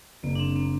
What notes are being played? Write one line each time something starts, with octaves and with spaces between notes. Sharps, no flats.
F#1 A#3
D4
C4
A#3